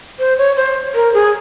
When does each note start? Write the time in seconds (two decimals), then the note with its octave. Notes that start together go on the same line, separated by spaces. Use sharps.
0.19 C5
0.38 C#5
0.56 C5
0.95 A#4
1.14 G#4